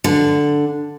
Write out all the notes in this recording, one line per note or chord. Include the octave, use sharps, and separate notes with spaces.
D3